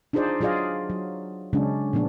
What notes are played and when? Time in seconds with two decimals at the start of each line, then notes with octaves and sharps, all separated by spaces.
0.13 D4 D#4 F4 G#4 C5 D5
0.40 F#3 F4 G#4 D5 D#5 F5
0.90 F#3
1.53 C#3 F#3 G#3 C#4 D4
1.93 A#2 F3 B3 D4